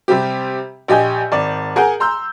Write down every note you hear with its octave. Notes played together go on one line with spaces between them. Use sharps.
C3 G3 C4 G4
A#1 G4 D#5 G#5 G6
G#1 D5
G#4 A#4 F#5 G#5 A#5 G6
A#5 C6 E6 G6